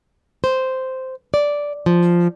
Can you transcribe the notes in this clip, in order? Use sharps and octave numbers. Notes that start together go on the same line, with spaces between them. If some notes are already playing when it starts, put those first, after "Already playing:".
C5
D5
F3